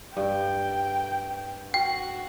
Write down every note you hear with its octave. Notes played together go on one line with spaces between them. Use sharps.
G2 G5
F#4 G5